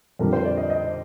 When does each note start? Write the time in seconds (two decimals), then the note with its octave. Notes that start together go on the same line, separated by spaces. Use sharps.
0.19 F2 D3 G3 A#4
0.33 C5
0.45 D5
0.57 D#5
0.70 D#5